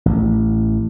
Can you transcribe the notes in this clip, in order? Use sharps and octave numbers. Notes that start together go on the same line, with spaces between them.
A1